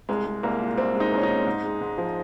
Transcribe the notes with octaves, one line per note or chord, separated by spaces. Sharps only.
C2 G#3
G#3
C2 A#3
A#2
C2 C4
G#3
D#4
C2 C#4
D#4
A#2
G#2
G#3
G#2
F3